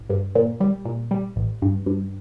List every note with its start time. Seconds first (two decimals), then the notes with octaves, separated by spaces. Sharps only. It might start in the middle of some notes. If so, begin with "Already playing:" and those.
Already playing: A1
0.10 G2
0.35 A#2
0.60 G3
0.85 A#2
1.11 G3
1.36 A1
1.62 G2
1.86 G2